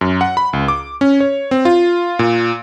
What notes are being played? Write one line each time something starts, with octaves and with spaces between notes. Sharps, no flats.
F#2
F#5
B5
C#2
D6
C#4
C#5
C4
F4
A#2